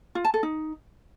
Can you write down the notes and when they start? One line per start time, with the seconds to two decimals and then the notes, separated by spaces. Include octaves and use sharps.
0.15 F4
0.24 A5
0.34 A4
0.43 D#4